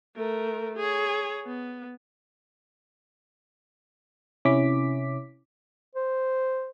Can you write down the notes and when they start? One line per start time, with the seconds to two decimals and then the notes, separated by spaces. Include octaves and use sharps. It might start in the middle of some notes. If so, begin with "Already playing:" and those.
0.17 A3 A#4
0.77 G#4 C#5
1.46 B3
4.45 C3 C#4 E4 D6 B6
5.96 C5